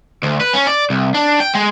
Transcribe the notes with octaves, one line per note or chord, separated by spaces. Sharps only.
D2
B4
C#4
D5
C2
D4
G5
G#3